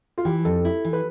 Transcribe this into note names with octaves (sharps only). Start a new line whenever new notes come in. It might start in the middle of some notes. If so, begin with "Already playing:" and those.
F4
E3 G4
F2 A4
E4
E3
B4